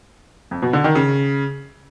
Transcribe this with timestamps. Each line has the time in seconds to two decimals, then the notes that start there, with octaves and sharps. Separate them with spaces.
0.51 F2
0.62 B2
0.73 D3
0.84 D#3
0.95 C#3